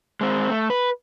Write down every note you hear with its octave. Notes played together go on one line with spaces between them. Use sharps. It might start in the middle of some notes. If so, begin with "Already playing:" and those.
G#3 C4
A3
B4